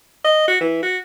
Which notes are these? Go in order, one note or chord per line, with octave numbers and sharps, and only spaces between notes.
D#5
F#4
E3
F#4